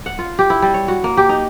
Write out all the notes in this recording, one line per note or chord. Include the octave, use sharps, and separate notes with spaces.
F#5
F4
G4
E4
G3
C#5
F#4
A#3
G4
D#4